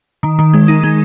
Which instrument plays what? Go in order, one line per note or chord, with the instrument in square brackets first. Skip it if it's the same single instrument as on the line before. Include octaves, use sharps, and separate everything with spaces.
[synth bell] D#3
D#3
G#3
D#4
G#3